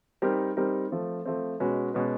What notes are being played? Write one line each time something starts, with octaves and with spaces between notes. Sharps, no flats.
G3 C4 D#4 G4 A#4
G3 C4 D#4 G4 A#4
F3 A3 C4
F3 A3 C4
B2 G#3 C#4 F#4 B4
B2 G#3 C#4 F#4 B4